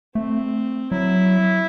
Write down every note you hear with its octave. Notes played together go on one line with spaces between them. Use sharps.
A3 C4
F#3 E4